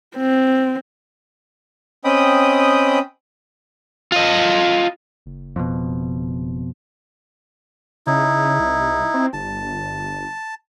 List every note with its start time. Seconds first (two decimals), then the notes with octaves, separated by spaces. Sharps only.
0.17 C4
2.05 C4 C#4 D#5 G5 B5 D#6
4.12 F4 D#5
5.26 F#1
5.56 F2 B2
8.07 C#3 D#4 E4
8.60 C2
9.14 C4
9.33 G1 A5